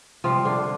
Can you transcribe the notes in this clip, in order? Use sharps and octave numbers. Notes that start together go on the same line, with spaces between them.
C3 F3 G3 F4
D3 D4